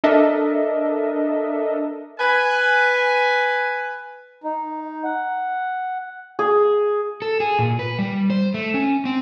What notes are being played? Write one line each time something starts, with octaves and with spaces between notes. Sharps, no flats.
D4 A4 A#4 D#5 E5
B4 G#5
D#4
F#5
G#4
A4
G#4
A#2
B4
G3
C5
A3
C#4
C4